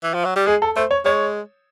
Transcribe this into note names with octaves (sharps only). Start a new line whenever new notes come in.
E3
F3
F#3
G3
G#3 G#4
A4
A3 C5
C#5
G#3 C#5